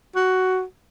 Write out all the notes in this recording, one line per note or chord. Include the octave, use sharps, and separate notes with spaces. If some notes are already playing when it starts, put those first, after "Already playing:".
F#4